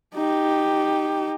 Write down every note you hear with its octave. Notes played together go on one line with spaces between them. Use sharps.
D#4 G4